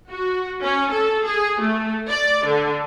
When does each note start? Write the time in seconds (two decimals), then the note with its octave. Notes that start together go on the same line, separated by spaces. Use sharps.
0.10 F#4
0.63 C#4
0.93 A4
1.26 G#4
1.61 A3
2.11 D5
2.47 D3